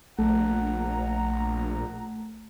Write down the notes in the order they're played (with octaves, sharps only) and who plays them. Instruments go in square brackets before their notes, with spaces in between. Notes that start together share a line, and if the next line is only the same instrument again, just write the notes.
[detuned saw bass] A#1 [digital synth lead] A3 [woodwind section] F#5 A#5